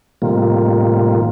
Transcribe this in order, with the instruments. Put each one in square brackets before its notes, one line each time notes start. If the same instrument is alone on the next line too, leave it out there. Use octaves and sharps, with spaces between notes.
[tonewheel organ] A2 C3 D#3 G3 A#3 F4